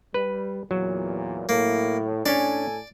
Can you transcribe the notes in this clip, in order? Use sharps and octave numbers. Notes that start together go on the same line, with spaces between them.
G3 B4
E2 A#2 F#3
A2 A#3
A2 C#4 D4 A4 D5 G#5